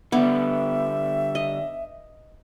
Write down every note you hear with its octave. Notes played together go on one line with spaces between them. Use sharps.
D3 G3 B3 E5
D#5